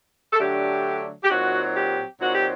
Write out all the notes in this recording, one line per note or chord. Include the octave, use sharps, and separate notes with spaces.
A4
D3 F#3 A3 D4 G4
G4
A#2 F#3 C4 D#4 F#4
G4
A#2 F#3 C4 D#4 F#4
G4